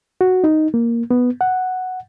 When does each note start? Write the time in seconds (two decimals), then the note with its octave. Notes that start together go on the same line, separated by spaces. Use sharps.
0.21 F#4
0.44 D#4
0.74 A#3
1.11 B3
1.41 F#5